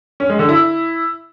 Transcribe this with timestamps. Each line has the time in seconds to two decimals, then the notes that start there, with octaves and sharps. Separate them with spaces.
0.20 C#4
0.30 G#3
0.39 D3
0.49 E4